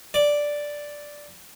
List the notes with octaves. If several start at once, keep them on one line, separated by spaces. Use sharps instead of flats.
D5